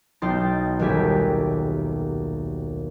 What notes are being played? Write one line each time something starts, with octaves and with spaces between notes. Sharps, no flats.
B1 D#4 G5 C6 A6
D#1 D#2 A3 G4 G#5 B6